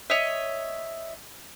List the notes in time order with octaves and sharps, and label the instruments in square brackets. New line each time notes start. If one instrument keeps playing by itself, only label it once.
[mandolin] C#5 D#5 E5